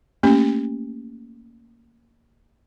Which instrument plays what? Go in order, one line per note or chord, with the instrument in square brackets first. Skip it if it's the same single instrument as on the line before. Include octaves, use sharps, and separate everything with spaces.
[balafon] A3 A#3 C#4 G4